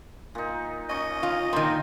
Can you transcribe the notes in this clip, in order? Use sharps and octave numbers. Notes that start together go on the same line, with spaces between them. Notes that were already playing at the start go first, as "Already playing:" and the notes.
A#2 D#4
C#4 D#5 G#5 C#6
F4
A#2 D#3 C5